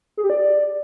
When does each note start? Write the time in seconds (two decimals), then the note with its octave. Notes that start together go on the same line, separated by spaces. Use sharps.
0.17 G#4
0.24 G4
0.30 D5